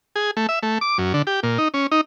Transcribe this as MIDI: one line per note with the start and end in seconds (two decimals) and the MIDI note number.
0.16 0.31 68
0.37 0.47 57
0.49 0.59 76
0.63 0.78 57
0.81 0.98 86
0.98 1.13 42
1.14 1.22 50
1.27 1.40 67
1.43 1.58 46
1.58 1.68 63
1.74 1.87 61
1.91 2.01 63